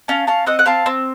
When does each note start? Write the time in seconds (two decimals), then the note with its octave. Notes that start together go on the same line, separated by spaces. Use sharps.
0.08 C#4 F5 A5
0.27 C#4 F5 A5
0.46 C4 D#5 F#5
0.59 F#5
0.66 C4 F5 A5
0.86 C4